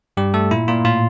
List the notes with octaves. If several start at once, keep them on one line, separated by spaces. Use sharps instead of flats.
G2 G3 G4
A3 A4
A#2 E4
A#2 F4
A2 F4